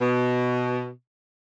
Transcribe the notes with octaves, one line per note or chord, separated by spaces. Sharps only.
B2